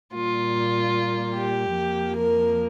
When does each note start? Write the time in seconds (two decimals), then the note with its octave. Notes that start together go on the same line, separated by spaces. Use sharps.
0.14 A#2 G3 A#3 F4
1.36 G4
1.77 F2 F3 A#3
2.17 A#4